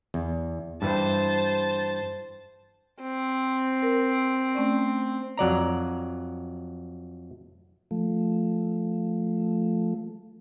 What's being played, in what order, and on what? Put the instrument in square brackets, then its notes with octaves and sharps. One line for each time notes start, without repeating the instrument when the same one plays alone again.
[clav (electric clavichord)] E2
[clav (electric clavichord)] G2 E3 [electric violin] C5 A5
[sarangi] C4
[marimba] A#4
A3 C#4 D5
[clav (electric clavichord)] F2 F#3 D5 A#5
[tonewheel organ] F3 A3